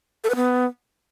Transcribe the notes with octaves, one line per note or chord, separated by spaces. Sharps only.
A4
B4
B3